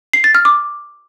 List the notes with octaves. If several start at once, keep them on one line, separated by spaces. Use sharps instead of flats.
C7
A6
F6
D6